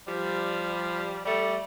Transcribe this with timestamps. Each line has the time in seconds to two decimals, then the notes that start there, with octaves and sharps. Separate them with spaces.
0.08 F3 G3
1.26 G3 A3